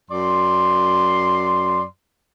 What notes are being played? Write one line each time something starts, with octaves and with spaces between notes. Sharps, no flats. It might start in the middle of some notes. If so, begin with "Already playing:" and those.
F#2 D5 C6